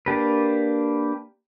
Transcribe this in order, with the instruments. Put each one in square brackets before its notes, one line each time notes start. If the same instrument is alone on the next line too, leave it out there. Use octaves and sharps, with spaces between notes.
[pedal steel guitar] A#3 D4 G4 B4